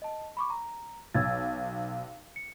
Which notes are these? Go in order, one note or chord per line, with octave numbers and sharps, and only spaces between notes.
D#5 A5
B5 C#6 D6
A#5
B1 E6 G#6 A6
C#7